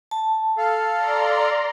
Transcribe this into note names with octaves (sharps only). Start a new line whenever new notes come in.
A5
A4 F5
D5 A#5 C6